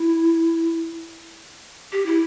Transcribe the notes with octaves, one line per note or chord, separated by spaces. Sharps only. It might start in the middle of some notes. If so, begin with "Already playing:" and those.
Already playing: E4
G4
E4